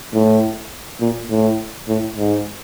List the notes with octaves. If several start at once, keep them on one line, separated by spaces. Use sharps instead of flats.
A2
A#2
A2
A2
G#2